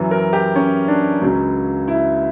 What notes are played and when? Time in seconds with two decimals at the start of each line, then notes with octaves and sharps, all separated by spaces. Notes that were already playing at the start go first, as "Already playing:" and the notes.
Already playing: F#2 E3
0.11 A#4
0.33 G4
0.56 C#4
0.88 D4
1.21 C#2 C#3 F#3
1.88 E4